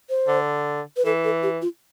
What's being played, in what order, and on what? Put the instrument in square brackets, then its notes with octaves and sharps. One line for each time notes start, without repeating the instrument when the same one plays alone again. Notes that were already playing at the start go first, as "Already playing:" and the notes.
[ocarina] C5
[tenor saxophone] D3
[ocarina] B4
[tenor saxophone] E3 [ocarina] A4
[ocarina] A4
G4
F4